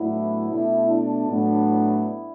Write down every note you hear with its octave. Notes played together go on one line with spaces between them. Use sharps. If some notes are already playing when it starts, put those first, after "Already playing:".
Already playing: A2 F#3 B3 D4 E4
B2 A3 D4 E4
D4
A2 F#3 B3 D4
E4